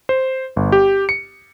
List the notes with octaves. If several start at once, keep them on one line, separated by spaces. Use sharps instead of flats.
C5
G1
G4
C#7